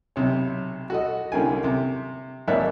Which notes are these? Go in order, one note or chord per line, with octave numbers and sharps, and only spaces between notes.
B1 C3 C#5
F#4 A4 D#5
C2 D3 A#3 C#4 G5 G#5
C3
G#1 A#3 C#5 D5 E5 F#6